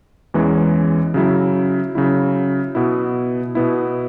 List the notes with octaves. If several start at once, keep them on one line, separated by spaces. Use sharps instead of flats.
E2 E3 G#3 C#4
C#3 F#3 E4
C#3 F#3 E4
B2 B3 E4
B2 B3 E4